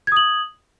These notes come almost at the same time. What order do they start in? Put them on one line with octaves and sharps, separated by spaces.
G#6 D#6 F#7